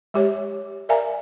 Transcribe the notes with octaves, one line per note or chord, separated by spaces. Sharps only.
G#3 G4 C#5
A#4 D5 E5 F5 G#5 A#5